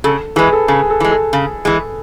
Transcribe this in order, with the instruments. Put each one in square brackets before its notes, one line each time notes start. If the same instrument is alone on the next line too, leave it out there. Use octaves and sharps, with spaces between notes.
[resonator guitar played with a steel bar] C#3 [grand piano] A4
[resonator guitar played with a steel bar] E3 G#3 [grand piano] G#4 B4
[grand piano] A4
[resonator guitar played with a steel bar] C#3 [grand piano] G#4
[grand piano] A4
[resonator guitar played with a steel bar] E3 G#3
[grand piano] A4
[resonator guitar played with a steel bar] C#3
E3 G#3